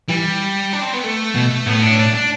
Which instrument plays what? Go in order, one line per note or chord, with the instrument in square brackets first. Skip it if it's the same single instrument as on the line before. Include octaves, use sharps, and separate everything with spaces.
[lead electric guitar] E3 [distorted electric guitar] G3
[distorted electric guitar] D4
C4
B3
A3
[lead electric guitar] B2
[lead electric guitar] A2 [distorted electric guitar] B3
[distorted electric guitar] D4
D4
D4